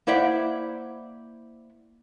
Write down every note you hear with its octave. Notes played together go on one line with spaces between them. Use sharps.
A#3 E4 C5 D5 E5 F#5